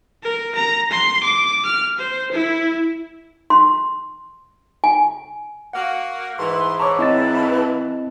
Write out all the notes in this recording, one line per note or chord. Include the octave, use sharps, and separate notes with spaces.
A#4
A#5
C6
D6
F6
C5
E4
C6
G#5
A#3 F#4 F#5
G#2 E3 C6 C#6
C#5 A5 A#5 C#6 D6
C4 E4 D#5 A5 A6